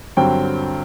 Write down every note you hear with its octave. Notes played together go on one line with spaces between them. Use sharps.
G2 D3 F#3 C4 G5